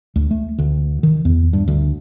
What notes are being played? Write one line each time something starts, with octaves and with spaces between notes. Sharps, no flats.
D2
A3
D2
D#3
E2
G2
D2